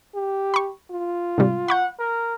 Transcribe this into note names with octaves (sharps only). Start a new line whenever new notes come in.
G4
B5 C#6
F4
G#2 C3 G3
F#5 B5 C#6 G6
A#4